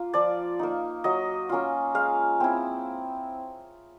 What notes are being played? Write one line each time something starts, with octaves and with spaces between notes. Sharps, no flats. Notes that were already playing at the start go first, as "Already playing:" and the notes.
Already playing: A#3 F4
F3 D5
A#3 D#4
F#3 D#5
A#3 C#4 F4
G#3 F5
C4 E4